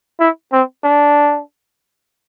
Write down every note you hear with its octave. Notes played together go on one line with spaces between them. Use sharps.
E4
C4
D4